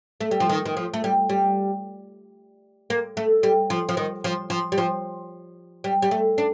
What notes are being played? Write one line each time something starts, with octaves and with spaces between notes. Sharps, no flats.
A3
G3
F3
D#3
D#3
F3
A3
G3
G3
A#3
A3
G3
F3
F3
D#3
F3
F3
G3
F3
G3
G3
A3
D4